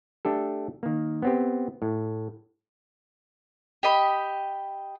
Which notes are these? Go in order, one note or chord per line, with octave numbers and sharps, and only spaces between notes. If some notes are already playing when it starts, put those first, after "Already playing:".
A3 D4 G4 A4
D#3 A#3
B3 C4 G4
A2
G4 D#5 B5